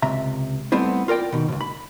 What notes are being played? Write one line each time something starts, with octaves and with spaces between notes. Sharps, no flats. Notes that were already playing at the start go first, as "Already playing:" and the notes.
C#2 C3 E5 A#5
G3 A3 B3 C4 E4 C5
F4 A#4 D5 G5
B2 D#3
C#2 A2
B5